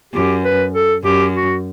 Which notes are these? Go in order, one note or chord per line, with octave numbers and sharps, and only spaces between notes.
F#2 G4
B4
A4
F#2 G4
F#4